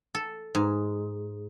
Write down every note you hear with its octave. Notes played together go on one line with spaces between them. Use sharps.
A4
G#2